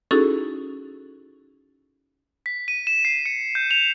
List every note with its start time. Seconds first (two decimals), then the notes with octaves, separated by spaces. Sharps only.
0.11 C#4 D#4 E4 F#4 G#4 A4
2.46 B6
2.68 D#7
2.87 E7
3.05 C7
3.26 C#7
3.55 G6
3.71 F7